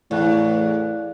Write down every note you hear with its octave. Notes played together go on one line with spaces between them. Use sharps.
E2 A2 D5 F5 F#6